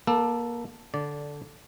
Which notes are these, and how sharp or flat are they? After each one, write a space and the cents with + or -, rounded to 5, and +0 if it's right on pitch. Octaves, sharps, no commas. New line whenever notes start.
A#3 +25 A4 +0
D3 -5 D5 -15